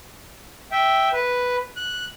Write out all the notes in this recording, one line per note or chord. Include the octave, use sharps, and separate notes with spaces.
E5 G5
B4
F#6